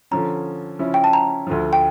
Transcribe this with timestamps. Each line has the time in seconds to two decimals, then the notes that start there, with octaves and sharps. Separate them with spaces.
0.11 D3 F3 C#4 A#5
0.79 C#3 F3 C#4 E4
0.94 G5
1.04 A5
1.13 A#5
1.47 D2 D3 F3
1.73 G5